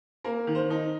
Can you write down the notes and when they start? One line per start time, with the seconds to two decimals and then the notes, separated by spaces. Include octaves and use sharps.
0.24 A#3 A#4
0.47 D#3
0.55 C5
0.70 D#4